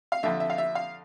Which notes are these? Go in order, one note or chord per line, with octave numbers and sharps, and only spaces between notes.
F5
F2 D3 E5
E5
F5
E5
F5